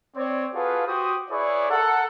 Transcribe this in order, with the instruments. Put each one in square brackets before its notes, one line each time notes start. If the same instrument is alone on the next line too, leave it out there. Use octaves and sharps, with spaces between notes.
[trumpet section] C4 C#5 D5
F4 F#4 G#4 A4 B4 F5
F#4 G4 C5 D#6
E4 G#4 B4 C#5 D5
A4 A#4 F#5